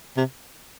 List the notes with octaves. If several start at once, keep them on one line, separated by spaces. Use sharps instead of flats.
C3